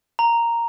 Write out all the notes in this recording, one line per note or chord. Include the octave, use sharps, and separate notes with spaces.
A#5